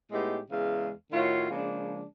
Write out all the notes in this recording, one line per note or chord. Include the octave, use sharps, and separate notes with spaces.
A2 G#3 B3 D#4 G4
E2 C#3 G#3 F5
A2 D#3 F4 F#4 C#5
C#3 F3 G#3 A#3 D4